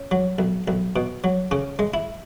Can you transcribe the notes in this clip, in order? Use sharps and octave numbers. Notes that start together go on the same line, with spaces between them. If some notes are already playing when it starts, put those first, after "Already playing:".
Already playing: C#4
F#3
B1
B1
B2
F#3
C#3 C#4
G#3
E4